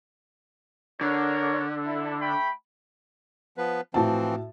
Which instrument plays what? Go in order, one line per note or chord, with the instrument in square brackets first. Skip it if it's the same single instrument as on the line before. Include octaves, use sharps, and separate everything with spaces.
[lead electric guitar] D3 [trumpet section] D4 A#4 C#5
[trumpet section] E4 A4
A3 G5 B5
[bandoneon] F3 B3 B4
[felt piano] A2 F#4 A5 [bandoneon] E3 F3 C4